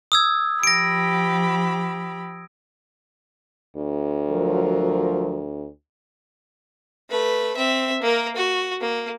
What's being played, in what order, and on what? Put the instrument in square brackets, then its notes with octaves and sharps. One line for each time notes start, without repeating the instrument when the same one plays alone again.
[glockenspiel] D#6 E6 G#6
[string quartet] F3 G4 B5 [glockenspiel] A#6 D7
[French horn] D2
[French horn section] F3 F#3 A#4
[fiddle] A3 B4
C4 E5
A#3 A#4
F#4
A#3